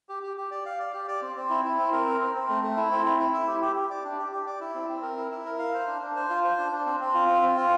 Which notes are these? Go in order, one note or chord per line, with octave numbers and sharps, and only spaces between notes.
G4
G4
G4
D5
F5
D5
G4
D5
C4
C4
E4
E4
C4
A#4
C4
C4
C4
A3
A3
E4
C4
E4
E4
E4
G4
G4
G4
D5
D4
G4
G4
D5
E4
C4
C4
A#4
E4
E4
A#4
F5
C5
D4
D4
C5
F4
C5
D4
D4
C4
C4
F4
C4
C4
F4